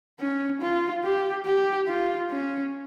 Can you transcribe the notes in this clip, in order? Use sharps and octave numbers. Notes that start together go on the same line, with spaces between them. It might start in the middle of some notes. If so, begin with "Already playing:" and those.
C#4
F4
G4
G4
F4
C#4